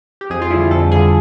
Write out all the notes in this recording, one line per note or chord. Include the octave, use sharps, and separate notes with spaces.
G4
F2 G#4
F4
D3 G3 E4
F2 A4
D3 G3 G#4